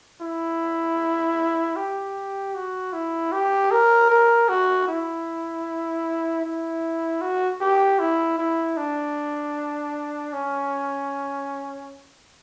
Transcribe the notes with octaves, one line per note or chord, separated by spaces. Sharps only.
E4
G4
F#4
E4
G4
A#4
A#4
F#4
E4
E4
F#4
G4
E4
E4
D4
C#4